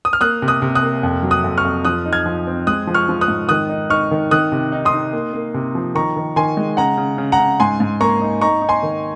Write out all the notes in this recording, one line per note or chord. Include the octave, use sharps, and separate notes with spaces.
D#6
F6
A#3 D#6 F#6
C3
D#6 F#6
C3
D#6 F#6
A#3
F2
F#3
D#6 F#6
F2
C#6 F6
F2
F3 D#6 F#6
D#4
F6 G#6
F3
C4
G#3 D#6 F#6
F3
C#6 F6
F3
D#6 F#6
G#2
D#3 D#6 F#6
D#4
D#4 C#6 F6
D#3
D#3 D#6 F#6
C3
D#4
C6 D#6
D#4
A#3
A#3
C3
F3
D#3 A#5 C#6
D#3
D#3 G#5 C6
G#3
C#3 F#5 A#5
C#3
C#3
F#5 A#5
C#3
G#2 G#5 C6
G#2
A#3 A#5 C#6
D#4
D#4 A#5 C#6
D#4
G#5 C6
D#3